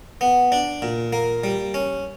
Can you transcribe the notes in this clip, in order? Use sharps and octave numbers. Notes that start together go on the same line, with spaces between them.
B3
D4
A#2
A#3
G3
C#4